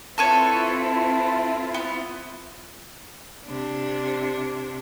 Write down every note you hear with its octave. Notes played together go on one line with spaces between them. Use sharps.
C4 E4 F4 A4 B4 C#5
B3
C3 D4